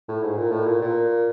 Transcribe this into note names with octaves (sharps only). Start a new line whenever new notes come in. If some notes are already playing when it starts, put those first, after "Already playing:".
A2
G#2
A#2
A2
A#2
A#2